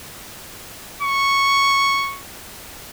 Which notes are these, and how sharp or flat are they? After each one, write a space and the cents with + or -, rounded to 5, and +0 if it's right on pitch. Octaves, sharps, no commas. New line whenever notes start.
C#6 -5